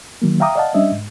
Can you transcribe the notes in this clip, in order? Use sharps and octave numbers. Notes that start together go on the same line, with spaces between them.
D#3 F#3 A#3
E5 F5 G5 A#5 D6 D#6
D5 D#5 F5 F#5 A5
G3 C#4 D4 D#5 E5
G#2